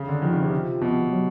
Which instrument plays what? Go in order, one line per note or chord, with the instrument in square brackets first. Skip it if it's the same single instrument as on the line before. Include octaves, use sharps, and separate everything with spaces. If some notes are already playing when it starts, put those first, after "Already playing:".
Already playing: [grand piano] C#3
D3
[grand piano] D#3 [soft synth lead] F3
[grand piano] C#3
C3
B2
[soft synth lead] F#3